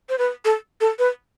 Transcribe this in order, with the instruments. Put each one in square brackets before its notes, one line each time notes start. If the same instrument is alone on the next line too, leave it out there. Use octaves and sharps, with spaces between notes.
[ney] C5
B4
A4
A4
B4